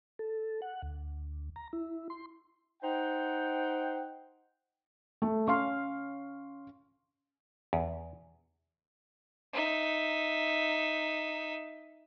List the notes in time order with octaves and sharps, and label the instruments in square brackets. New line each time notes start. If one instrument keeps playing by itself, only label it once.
[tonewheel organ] A4
F#5
D2
A#5
E4
C6
[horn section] D#4 C5 F#5 G5
[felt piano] A3
[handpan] C#4 F5 [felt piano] C6 C#6
[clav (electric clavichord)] E2
[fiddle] D#4 E5